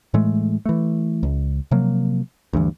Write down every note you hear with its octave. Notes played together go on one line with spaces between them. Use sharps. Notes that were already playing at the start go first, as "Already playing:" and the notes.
A2 E3 G#3 A3
E3 A3
C#2
C3 F3 F#3 A#3
D2 G2 E3